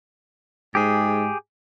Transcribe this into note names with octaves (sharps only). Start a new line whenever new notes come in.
G#2 G4 G#4